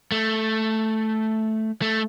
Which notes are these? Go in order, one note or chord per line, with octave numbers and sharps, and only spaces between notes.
A3
A3